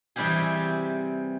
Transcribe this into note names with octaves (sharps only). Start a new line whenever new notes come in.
C3 E3 G3 C4 G4 G#4